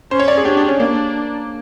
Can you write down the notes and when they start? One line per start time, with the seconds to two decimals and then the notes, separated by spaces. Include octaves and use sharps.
0.11 C#4 C5
0.19 C#5
0.28 D5
0.37 G#4
0.45 D4 G4
0.57 G4
0.69 C#4
0.79 A#3 D4